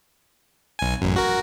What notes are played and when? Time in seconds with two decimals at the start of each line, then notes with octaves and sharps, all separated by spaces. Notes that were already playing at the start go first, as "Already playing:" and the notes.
0.79 B1 G#5
1.01 A1 F#2
1.16 F#4 A#4